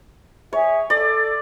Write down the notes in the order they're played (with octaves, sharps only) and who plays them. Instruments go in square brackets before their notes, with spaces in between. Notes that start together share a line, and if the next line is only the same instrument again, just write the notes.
[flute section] G#4 E5 [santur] C#5
[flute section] A4 [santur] D5